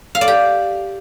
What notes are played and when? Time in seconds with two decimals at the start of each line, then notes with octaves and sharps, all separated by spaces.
0.15 F5
0.21 D5
0.28 G4